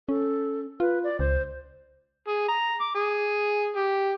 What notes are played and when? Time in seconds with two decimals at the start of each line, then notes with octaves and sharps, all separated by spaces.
0.09 C#4 A4
0.80 F4 B4
1.04 D5
1.19 C#2 C5
2.28 G#4
2.48 A#5
2.80 D6
2.95 G#4
3.77 G4